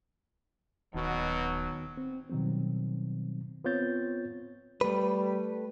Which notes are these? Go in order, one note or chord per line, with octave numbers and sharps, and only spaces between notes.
D#1 B2 D#3 F#3 B3 F#4
C4
B2 D#3 F#3 G3 C4
B3 C4 F4 C#5 G6 A6
G3 A3 B4